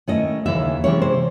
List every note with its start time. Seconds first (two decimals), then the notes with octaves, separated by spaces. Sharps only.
0.07 D#3 A3 C#4 E4 D#5
0.46 D#2 C#3 E3 E5
0.84 C3 E3 G#3 C#4 E4 C#5
1.02 C5